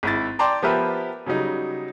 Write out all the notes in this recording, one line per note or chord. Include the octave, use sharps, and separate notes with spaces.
G#1 E4 A6
D5 G5 A5 A#5 C6 D6
F3 B3 G4 A#4 B4 E5
C#3 F#3 G3 D#4